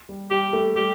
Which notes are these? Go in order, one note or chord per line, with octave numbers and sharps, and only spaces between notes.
G3
G3 G4
A3
G3 G4